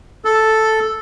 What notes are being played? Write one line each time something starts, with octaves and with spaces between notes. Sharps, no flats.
A4